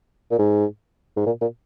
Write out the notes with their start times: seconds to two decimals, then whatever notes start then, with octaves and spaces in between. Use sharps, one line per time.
0.31 A#2
0.39 G#2
1.16 G#2
1.26 A#2
1.41 A#2